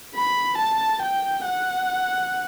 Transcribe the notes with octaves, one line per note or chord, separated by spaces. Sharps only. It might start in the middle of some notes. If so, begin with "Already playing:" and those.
B5
A5
G5
F#5